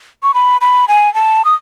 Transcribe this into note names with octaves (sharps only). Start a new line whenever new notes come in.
C#6
B5
B5
G#5
A5
D#6